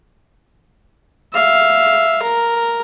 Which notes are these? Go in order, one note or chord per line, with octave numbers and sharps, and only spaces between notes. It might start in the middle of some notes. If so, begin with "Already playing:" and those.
E5 F5
A#4